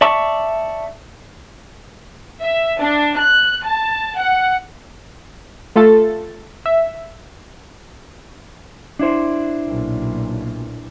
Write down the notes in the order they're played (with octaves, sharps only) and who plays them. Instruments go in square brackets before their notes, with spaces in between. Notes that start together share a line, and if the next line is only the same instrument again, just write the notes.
[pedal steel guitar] D5 E5 A5 C#6
[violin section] E5
D4
F#6
A5
F#5
[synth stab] A3 F4 A4 A6
E5
[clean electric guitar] D4 E4 C5
[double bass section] B1 A#2